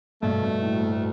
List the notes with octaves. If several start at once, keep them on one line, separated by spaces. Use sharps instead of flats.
G2 B2 A3
G2 B2
D2 A2
G2